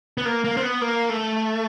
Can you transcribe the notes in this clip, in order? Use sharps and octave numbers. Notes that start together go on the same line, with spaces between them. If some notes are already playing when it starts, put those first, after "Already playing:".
B3
A#3
A#3
C4
B3
A#3
A3